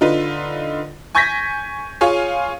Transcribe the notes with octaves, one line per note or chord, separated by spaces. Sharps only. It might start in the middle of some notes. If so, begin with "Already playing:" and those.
D3 D#4 F4 B4
G#5 C#6 G6 G#6 A#6 B6
F4 G#4 C#5 F5 G#5